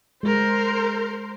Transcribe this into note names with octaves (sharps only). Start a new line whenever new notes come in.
G#3 A#4 C5